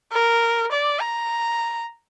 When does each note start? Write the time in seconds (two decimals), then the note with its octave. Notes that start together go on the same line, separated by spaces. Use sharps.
0.12 A#4
0.71 D5
1.01 A#5